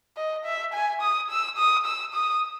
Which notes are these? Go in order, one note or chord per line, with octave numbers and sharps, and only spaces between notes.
D#5
E5
G#5
D#6
E6
D#6
E6
D#6